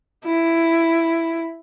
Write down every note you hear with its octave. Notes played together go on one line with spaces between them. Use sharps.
E4